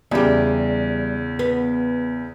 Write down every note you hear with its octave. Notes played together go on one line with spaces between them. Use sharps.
E2 C#3 G3 G4
B3